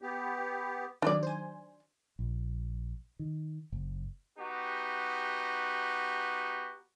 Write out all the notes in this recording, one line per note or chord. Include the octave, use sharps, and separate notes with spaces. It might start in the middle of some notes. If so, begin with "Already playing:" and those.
B3 G4
D#3 F#3 D4 D5
C5 G#5
A#1
D#3
F#1
B3 D#4 F#4 G4